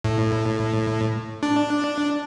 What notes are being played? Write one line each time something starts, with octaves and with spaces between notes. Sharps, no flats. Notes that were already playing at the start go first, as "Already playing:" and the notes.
A2
D4